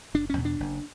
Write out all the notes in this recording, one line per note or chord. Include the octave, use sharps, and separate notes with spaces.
F#1 D4
C#4
E2 B2
D4
F#1